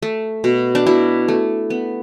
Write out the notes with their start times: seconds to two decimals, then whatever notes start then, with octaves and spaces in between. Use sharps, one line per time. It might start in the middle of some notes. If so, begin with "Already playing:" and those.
0.02 A3
0.44 B2
0.75 D4
0.86 B2 E4
1.28 A3
1.70 B3